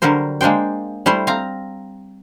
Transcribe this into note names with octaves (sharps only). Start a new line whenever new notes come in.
D3 F#3 G3 A#4 C5
G#3 A#3 D4 C5 G5
G3 A3 E4 C5
C4 F5 A#5